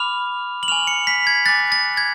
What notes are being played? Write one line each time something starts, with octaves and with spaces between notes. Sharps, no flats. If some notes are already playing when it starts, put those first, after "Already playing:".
Already playing: B5 D6 F6 F7
F#7
G#5 C#6 F6 F7
C#7
B6
G#6
G#5 D6 F#6 A6
A6
G#6